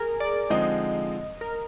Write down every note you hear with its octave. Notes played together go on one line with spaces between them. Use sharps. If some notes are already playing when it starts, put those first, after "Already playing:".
Already playing: G#4 A#4
D5
D3 F3 G#3 C4 D#4 D#5
A#4